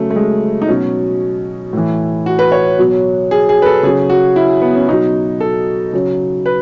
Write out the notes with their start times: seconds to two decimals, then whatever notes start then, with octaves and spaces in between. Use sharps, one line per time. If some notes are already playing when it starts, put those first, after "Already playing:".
Already playing: C#3 F#3 A3
0.10 A3
0.16 G#3
0.62 D#4
0.68 B2 F#3 C#4
1.73 A2 E3
2.26 F#4
2.39 B4
2.52 C#5
2.78 B2 F#3
3.31 G#4
3.49 G#4
3.62 B4
3.66 A4
3.83 C#3 F#3 G#4
4.10 F#4
4.36 E4
4.62 B3
4.75 C#4
4.88 B2 D#4
4.92 F#3
5.40 A4
5.93 C#3 F#3
6.46 B4